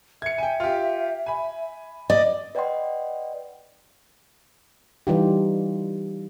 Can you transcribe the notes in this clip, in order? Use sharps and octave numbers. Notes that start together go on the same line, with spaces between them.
E5 G#6 C#7
G5 G#5
F4 G4
G#5 B5
D5 D#5
B4 D5 D#5 F#5 G5 C6
E3 G3 D#4 F4 G4